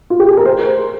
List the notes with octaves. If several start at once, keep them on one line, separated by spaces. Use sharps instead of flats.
F4
G4
G#4
A#4
C5